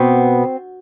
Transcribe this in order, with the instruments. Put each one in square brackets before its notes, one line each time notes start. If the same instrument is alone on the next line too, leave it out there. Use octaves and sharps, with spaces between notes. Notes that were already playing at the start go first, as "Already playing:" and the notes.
Already playing: [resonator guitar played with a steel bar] B2 B3 C4